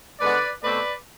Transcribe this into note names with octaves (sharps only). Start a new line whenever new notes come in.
D3 G#3 B3 B4 D5
B2 A3 C4 B4 D5